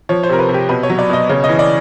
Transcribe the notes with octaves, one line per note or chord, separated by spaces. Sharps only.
F3 C#5
C5
C3 A#4
B4
C3
G4
B2 B4
C#5
F#3
D5
B2 D#5
C#3 C#5
D#5
E3
D5